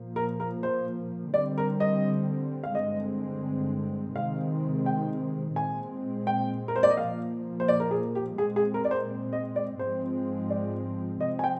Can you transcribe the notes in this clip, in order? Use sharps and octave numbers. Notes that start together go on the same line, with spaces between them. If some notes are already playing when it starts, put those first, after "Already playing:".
Already playing: A#2 F3 A#3
A#4
A#4
C5
D3 G3 C4 D5
A#4
D#5
F5
G2 D3 G#3 C4 D#5
C3 D#3 G#3 C4 F5
G5
A#2 G#3 C4 G#5
G5
A#4
C5
D5
D#5
A#2 F3 A#3 F5
C5
D5
A#4
G#4
G4
A#2 G#3 C4 G#4
G#4
A#4
D5
C5
D#5
D5
G#2 F3 G#3 C4 C5
D5
C3 F3 C4 D#5
G#5
G5